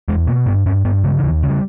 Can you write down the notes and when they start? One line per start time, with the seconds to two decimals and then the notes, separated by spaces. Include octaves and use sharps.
0.08 E2 G#3
0.27 B2 A#3
0.46 G2 B3
0.66 G2 C#4
0.85 G2 B3
1.04 C#3 G#3
1.19 D#3
1.23 D#2 E3
1.43 C#3
1.50 G3